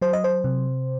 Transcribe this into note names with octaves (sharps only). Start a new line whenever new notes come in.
F#3 C5
D#5
C5
C3